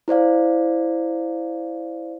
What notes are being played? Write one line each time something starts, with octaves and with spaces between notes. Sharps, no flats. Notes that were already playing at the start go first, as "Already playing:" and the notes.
E4 C5 D5 F5